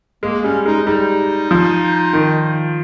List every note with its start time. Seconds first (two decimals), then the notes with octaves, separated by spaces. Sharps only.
0.23 G#3 A#3
0.44 G3 C#4
0.66 G#3 D#4
0.86 G3 D#4
1.51 F3
2.13 D#3